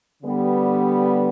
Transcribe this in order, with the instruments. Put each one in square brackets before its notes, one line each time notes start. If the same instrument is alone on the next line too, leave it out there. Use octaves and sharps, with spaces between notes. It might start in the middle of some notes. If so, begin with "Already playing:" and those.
[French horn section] D3 G3 B3